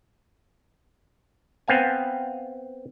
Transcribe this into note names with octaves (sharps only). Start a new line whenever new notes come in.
B3 C4 F5 G#5